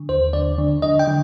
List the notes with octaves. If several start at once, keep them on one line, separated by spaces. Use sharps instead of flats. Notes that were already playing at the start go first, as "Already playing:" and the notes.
Already playing: D3
D#2 C5
D3 D5
D3
D3 D#5
G5
D3